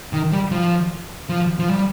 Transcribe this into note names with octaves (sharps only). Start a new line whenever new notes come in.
D#3
G3
F3
F3
F3
G3